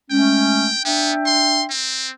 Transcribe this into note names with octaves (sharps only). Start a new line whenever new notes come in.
G#3 A3 C#4 G5
B3 D4 E5 G5
C6
C4